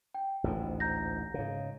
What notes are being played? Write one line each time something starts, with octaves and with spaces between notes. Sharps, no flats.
G5
A1 D2 G#2
A#5 G6 A#6
G#2 C#3